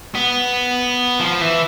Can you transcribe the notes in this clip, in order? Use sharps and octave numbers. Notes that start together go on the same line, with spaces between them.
B3
F3
E3